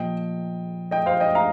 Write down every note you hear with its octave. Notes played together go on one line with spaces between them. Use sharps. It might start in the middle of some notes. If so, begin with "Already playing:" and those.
Already playing: A#2 F3 D#5 G5
D#5 G5
C5 F5
D#5 G5
F5 A#5